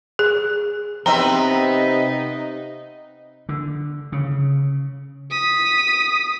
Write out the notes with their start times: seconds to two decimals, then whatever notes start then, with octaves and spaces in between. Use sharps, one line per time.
0.19 G#4
1.06 C3 B3 C4 D#4 E5 A#5
3.49 D3
4.12 C#3
5.31 D#6 B6